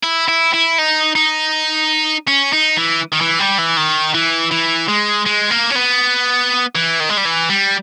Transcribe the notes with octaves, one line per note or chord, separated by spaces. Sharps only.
E4
E4
E4
D#4
D#4
C#4
D#4
E3
D#3
E3
G3
E3
D#3
E3
E3
G#3
G#3
A#3
C#4
B3
E3
D#3
G#3
G3
E3
G3